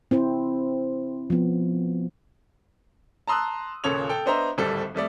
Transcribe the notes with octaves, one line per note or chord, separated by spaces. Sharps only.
C4 E4 C5
F3 B3
A5 A#5 C6 D#6 E6 F#6
D#1 A#2 C#3 A4 C#5 F7
A4 G5
B3 D4 C5 D#5 E5 A#5
D1 G#1 G3 A4
F2 G3 A3 D5